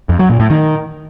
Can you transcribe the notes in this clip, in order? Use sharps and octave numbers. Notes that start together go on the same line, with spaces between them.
F2
F#3
A#2
A2
D#3